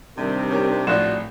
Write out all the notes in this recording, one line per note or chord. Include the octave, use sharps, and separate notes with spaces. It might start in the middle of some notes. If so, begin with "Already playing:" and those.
C3 D#3 G3 C4 D4
G4 A#4 C#5
A#1 A2 F4 F#4 D5 F#6 E7